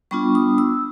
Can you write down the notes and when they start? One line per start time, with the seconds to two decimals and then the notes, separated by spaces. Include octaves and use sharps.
0.11 G3 B3 D4 F4 C#6
0.35 D#6
0.58 E6